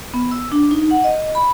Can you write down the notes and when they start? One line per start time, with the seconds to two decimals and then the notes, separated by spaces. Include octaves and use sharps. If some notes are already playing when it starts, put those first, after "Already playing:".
0.14 B3
0.31 E6
0.52 D4
0.71 D#4
0.91 F#5
1.04 D#5
1.35 B5